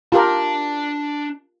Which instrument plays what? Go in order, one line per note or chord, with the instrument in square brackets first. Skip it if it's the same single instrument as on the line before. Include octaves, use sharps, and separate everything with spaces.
[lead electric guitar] D4 A5 [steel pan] F4 G4 A#4